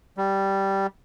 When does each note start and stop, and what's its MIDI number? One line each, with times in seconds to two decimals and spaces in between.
0.17 0.87 55